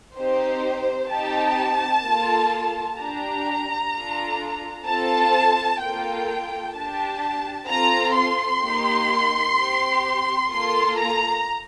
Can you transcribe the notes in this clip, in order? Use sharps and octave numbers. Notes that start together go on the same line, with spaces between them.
C4 D#4 G4 C5
C4 D#4 G4 A5
A#3 F4 A4
D4 G4 A#5
D4 F4 A4
C4 F4 A4 A5
A#3 F4 A4 G5
D4 G4 A5
C4 F4 A4 A#5
C6
A#3 D#4 G4
C4 G4
A#3 F4 A4 C6
A#5